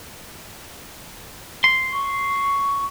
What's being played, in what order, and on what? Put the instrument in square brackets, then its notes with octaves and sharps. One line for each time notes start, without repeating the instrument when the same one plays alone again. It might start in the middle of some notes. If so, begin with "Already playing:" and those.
[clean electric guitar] C6
[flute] C#6